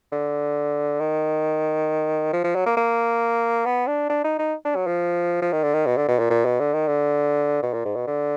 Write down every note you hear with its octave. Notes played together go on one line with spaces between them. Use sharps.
D3
D#3
F3
F3
F#3
A#3
A#3
B3
D4
D4
D#4
D#4
D4
F#3
F3
F3
D#3
D3
D#3
B2
D3
B2
A#2
A#2
B2
D3
D#3
D3
B2
A#2
G#2
B2
D3